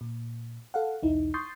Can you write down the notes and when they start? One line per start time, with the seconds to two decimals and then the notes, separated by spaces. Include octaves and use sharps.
0.01 A#2
0.74 A4 F5 F#5
1.03 B1 E2 D#4 E4
1.34 C6 C#6 D#6 G6 A6 C7